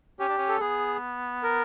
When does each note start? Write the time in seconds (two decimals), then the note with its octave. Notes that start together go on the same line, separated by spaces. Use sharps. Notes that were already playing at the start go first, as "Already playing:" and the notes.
0.20 C#4 G4
0.29 D4
0.38 C#4
0.48 A4
0.60 B3 G#4
1.43 A#4